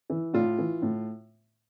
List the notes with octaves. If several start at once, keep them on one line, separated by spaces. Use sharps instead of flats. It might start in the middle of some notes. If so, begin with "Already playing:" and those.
E3
A2 F4
E3
A2